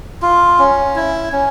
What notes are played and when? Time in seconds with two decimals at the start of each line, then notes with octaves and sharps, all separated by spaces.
0.22 F4
0.59 C#4
0.96 E4
1.32 C#4